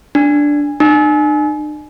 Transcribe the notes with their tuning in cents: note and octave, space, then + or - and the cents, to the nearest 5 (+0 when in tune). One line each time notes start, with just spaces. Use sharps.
D4 -5
D4 +45